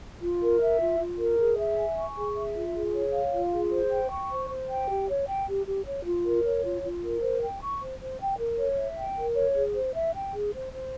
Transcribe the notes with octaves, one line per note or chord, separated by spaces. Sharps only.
F4
A#4
E5
F4
F4
A#4
G#4
E5
G#5
C#6
G#4
E5
F4
G#4
C#5
F5
F4
G#4
C5
G5
C#6
C5
C5
G5
G4
C#5
G5
G4
G4
C#5
F4
A#4
C#5
F4
F4
A#4
C5
G5
C#6
C5
C5
G5
A#4
C#5
E5
G5
A#4
C#5
G#4
C5
E5
G5
G#4
C5
C5